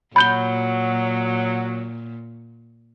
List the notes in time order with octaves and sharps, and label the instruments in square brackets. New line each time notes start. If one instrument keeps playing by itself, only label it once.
[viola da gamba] A#2 [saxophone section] F#3 [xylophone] B5 G6 G7